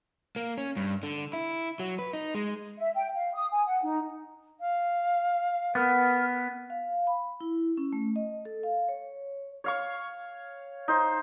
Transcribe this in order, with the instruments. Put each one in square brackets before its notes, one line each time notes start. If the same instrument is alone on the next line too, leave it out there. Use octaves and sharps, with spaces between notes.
[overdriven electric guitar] A#3
C#4
G2
D3
E4
F#3
B4
D#4
G#3
[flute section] E5
G5
F5
D#6
G#5
F#5
D#4
[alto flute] F5
[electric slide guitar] B3 [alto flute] A#4
[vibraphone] F5
B5
E4
C#4
A3
D#5
A4
F5
C#5
[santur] C#5 F5 C#6
D#4 C5